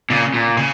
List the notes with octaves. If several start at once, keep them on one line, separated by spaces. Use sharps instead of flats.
A#2 C#3
A#2
C#3